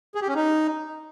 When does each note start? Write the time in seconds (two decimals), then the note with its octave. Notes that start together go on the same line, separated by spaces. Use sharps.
0.15 G#4
0.22 G4
0.28 C#4
0.35 D#4